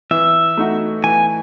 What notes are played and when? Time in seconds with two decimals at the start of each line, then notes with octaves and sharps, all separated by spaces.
0.11 E3 E5
0.57 A3 D#4 F#4
1.04 E3 G#5